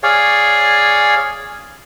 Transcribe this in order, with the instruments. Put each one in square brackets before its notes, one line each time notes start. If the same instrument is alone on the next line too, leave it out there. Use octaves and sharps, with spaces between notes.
[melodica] G#4 C#5 D5 F5